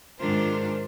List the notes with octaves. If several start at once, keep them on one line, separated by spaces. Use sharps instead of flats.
G#2 D#3 D4 F4 A#4 C5